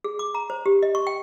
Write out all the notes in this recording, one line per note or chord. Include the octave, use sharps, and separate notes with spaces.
G#4
D6
A#5
C5
G4
D#5
C#6
G5